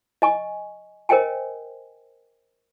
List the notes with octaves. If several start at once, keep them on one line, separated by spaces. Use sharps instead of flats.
D#5 G#5 C#6
A#4 C5 D#5 G5 G#5